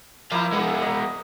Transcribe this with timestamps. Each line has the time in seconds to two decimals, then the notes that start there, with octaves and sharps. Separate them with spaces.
0.32 F3 A#3 E4 F5
0.53 G#3 B3
0.68 E5
0.82 D#5 A#5